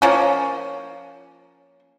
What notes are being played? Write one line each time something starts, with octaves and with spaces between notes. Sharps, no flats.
F3 A#3 C#4